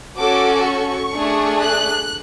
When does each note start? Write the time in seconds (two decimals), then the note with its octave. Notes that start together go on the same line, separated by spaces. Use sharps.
0.18 C#4 F#4 A4 D6
0.65 C#6
1.13 A3 D4 G#4
1.60 F#6